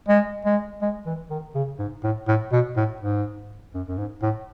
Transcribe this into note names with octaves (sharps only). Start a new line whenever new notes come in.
G#3
G#3
G#3
E3
D#3
C#3
G#2
A2
A2
B2
A2
G#2
F#2
F#2
G#2
A2